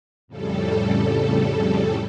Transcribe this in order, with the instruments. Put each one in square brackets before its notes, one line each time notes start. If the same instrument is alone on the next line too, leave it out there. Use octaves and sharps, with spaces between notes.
[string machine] F2 A2 C#3 G3 A4